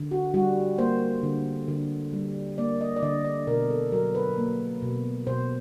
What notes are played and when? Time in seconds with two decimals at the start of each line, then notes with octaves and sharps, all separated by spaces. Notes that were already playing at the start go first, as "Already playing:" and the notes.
Already playing: D3
0.11 F#4
0.34 G3 F#4
0.78 A#3 C5
1.23 D3
1.68 D3
2.13 G3
2.58 A#3 D5
2.81 D#5
2.96 D5
3.03 D3 D#5
3.25 D5
3.47 B2 A#4
3.70 A4
3.92 F#3 A#4
4.15 B4
4.38 A#3
4.82 B2
5.27 B2 C5